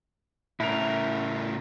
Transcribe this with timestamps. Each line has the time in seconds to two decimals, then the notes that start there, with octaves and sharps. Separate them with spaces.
0.60 A2 C#3 E4 A#4